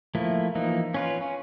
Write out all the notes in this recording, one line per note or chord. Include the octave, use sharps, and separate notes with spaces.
F3 A3 A#3 E4
E3 F3 A#3 D#4
C#4 F4 B4
C#4